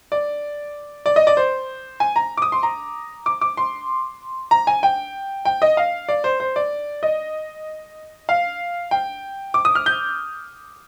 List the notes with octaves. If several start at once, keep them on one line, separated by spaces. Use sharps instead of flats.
D5
D5
D#5
D5
C5
G#5
A#5
D6
D#6
C6
A#5
D6
D6
C6
A#5
G#5
G5
G5
D#5
F5
D5
C5
C5
D5
D#5
F5
G5
D6
D#6
F6
G6